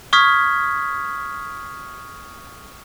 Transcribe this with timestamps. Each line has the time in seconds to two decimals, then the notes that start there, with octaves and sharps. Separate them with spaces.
0.13 C#6 D#6 F6 G#6 B6